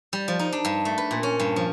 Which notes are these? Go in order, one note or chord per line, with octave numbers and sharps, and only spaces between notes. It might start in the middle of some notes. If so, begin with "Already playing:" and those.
G3
F3
D#4
D4
G2
A3
B4
A#2
C#4
G2
F3